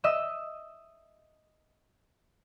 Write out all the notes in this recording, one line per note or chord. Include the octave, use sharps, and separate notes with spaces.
D#5 E5 E6